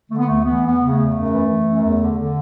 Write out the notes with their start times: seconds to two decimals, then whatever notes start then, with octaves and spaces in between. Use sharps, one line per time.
0.10 D3 A3
0.18 B3
0.26 D2 A3
0.44 E3 B3
0.62 E2
0.67 B3
0.80 C#3
0.90 A3
0.97 E2
1.13 F#2
1.31 E3
1.49 E3
1.66 F#2
1.82 E2
2.00 D3
2.18 D3